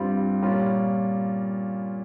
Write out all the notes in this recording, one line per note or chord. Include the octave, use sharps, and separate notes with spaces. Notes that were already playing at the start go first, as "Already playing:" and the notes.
Already playing: G2 G3 C4 F4
A#2 G3 C#4 F4